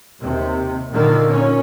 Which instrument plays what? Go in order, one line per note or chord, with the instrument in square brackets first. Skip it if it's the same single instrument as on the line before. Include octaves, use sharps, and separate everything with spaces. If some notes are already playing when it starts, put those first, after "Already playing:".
[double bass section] D#2 C3
A#2 D3 D#3 A#3
A#2 C#4